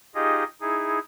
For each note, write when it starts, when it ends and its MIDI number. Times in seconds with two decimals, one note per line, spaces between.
0.15 0.44 63
0.15 0.44 65
0.15 0.44 67
0.15 0.44 68
0.15 0.44 75
0.61 0.99 63
0.61 0.99 64
0.61 0.99 68